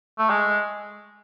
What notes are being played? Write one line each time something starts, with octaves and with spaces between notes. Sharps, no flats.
A3
G#3